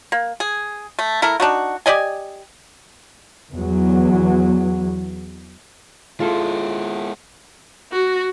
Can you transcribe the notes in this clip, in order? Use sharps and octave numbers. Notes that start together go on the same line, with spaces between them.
A#3
G#4
A3
A3 E4 A#4
D4 D#4 F#4
G4 D5 D#5 G#5
E2 F#3
G#3 E4 F4 A4
F#4